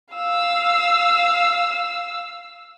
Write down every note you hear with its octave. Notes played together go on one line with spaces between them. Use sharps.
F5 E6